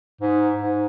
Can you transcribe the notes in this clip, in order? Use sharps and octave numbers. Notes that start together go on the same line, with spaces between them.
G#2
G#2